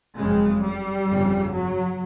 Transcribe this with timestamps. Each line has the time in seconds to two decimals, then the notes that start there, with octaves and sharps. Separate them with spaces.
0.18 F#1 F2 C#3 G#3
0.62 G3
1.07 G1 F2 C#3
1.52 F#3